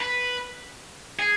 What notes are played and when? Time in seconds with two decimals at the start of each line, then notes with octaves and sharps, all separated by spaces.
0.01 B4
1.19 G#4